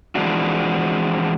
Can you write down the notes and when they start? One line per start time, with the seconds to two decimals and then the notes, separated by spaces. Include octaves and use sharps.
0.15 E3 F3 G#3 C4 D4 F#4